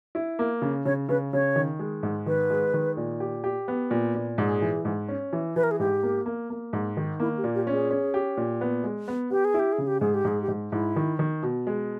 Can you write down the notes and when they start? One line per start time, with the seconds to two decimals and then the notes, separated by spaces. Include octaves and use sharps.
0.15 E4
0.39 A#3
0.62 C#3
0.85 C#3 C#5
1.09 C#3 B4
1.33 C#3 C#5
1.56 D#3
1.79 G#3
2.03 G#2
2.26 D#3 B4
2.50 G#3
2.74 D#3
2.97 A#2
3.20 G4
3.44 G4
3.68 B3
3.91 A#2
4.15 A#2
4.38 G#2 G#4
4.62 E3
4.85 G#2
5.09 C#4
5.33 E3
5.56 E3 B4
5.63 A#4
5.71 G#4
5.79 G#2 G4
6.03 A#3
6.26 A#3
6.50 A#3
6.73 G#2
6.97 D#3
7.20 A#3 E4
7.37 G4
7.44 A#2
7.55 G4
7.67 C#4
7.73 G#4
7.91 C#4
8.14 G4
8.37 A#2
8.61 B3
8.84 G#3
9.08 B3
9.31 B3 G4
9.44 G#4
9.54 E4
9.59 G4
9.72 G#4
9.78 C#3
9.87 G4
10.00 G#2 G#4
10.14 G4
10.25 G#2 G#4
10.42 G4
10.48 G#2
10.72 G#2 E4
10.96 D#3
11.19 D#3
11.43 B2
11.67 G#3